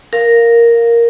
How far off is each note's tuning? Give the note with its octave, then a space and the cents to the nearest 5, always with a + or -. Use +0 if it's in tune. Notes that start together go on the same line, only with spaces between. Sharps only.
A#4 +0 F5 +0